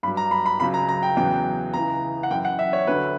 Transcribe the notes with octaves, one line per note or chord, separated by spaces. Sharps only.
G2 F#3 B5
A#5
B5
B5
C#2 C#3 F#3 B5
A#5
A#5
G5
E2 C#3 F#3 G5
C#2 C#3 E3 A#5
F#5
F#2 E3 G5
F#5
E5
C#5
D2 D3 F#3 B4